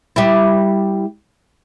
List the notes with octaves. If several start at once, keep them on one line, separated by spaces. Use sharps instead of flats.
G3 E4